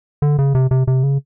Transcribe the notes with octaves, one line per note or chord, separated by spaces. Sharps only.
D3
C#3
C3
C3
C3
C#3